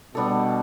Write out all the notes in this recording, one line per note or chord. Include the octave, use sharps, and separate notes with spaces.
B2 G3 B3 D4 A4